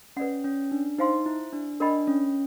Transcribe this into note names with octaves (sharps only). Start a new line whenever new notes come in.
C#4 B4 D5 F#5
C#4
D4
D#4 C5 F5 G#5 C6
E4
D4
D4 A#4 D#5 G5 B5
C#4